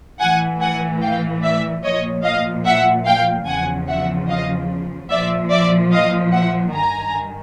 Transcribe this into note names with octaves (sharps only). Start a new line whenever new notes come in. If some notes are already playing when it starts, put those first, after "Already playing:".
A2 E3 F#5 G#5
F#5 G#5
F5 G5
D5 E5
A#2 F3 C#5 D#5
D#5 F5
E5 F#5
F5 G5
E2 C#3 F3 F#5 G#5
E5 F#5
D#5 F5
A#2 F3 D5 E5
D5 E5
D#5 F5
E5 F#5
G2 D#3 G#5 A#5